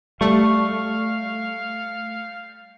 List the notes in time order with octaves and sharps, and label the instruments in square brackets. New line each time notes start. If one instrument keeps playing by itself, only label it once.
[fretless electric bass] G3 [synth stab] A3 [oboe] F5 [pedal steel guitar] C#6